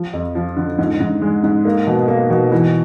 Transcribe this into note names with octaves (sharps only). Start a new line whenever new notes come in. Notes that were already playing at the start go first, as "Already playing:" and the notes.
Already playing: F3
F2
F3
D3
G#2
G#2
G#3
G#2
A#3
B2
A#3
B2
E3